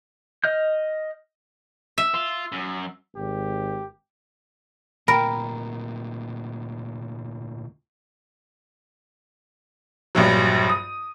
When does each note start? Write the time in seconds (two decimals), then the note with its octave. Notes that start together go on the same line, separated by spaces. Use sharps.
0.44 D#5 F6 G6
1.98 E5
2.14 F4
2.52 F#2
3.16 G#1 G4
5.08 D2 A#2 A#4 G5 B5
10.15 A#1 G2 F#3
10.70 D#6